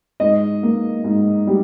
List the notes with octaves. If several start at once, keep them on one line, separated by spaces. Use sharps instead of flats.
G#2 D#5
A#3
G#2
G3